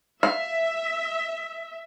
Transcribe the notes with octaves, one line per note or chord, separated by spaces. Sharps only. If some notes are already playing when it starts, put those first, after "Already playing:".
E5 F5